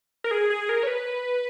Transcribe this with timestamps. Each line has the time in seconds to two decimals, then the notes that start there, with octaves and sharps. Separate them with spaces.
0.24 A#4
0.31 G#4
0.50 G#4
0.69 A#4
0.83 C#5
0.87 B4